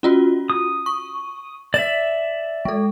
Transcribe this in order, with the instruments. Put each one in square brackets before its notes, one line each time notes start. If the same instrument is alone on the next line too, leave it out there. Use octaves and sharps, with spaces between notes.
[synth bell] C#4 F4 F#4
[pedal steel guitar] D#6
[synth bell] C#6
[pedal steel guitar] D5 E5 [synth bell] E7 F#7
[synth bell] G#3 A4